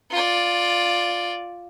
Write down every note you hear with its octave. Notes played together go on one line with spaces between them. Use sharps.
F4 D5